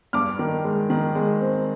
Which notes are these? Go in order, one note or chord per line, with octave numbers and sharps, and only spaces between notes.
G2 D6 F6
D#3
G#3
D#3
G#3
C4